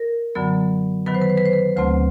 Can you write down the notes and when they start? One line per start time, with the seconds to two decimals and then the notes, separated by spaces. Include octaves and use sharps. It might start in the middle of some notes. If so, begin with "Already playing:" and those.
Already playing: A#4
0.35 F#2 D3 F#3 B3
1.06 D#3 F#3 B3 B4
1.15 C5
1.21 B4
1.30 C5
1.38 B4
1.46 C5
1.53 B4
1.76 D2 C#3 F#3 A3 C4 C5